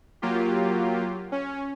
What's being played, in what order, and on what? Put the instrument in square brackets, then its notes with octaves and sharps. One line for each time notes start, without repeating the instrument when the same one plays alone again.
[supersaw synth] F#3 A#3 F4 G4
C#4